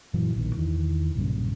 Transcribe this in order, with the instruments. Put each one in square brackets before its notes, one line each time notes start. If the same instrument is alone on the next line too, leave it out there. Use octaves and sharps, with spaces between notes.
[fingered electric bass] F#2 A#2 E3 F#3
A#1 B2 D#3
E2 D#3 E3
B1 G2 A#2 C#3